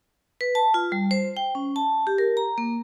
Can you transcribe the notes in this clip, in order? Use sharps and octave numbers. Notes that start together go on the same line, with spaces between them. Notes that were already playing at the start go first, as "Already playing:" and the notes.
B4
A5
F4
G3
C5
G5
C#4
A5
G4
A#4
A#5
A#3